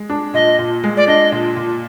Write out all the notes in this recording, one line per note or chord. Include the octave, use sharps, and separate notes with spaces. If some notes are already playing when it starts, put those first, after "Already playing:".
Already playing: G#3
D4
A#2 D#5
A#2
G#3
D5
D4 D#5
A#2
A#2